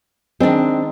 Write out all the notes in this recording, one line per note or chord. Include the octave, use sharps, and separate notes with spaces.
D#3 G#3 C4 D4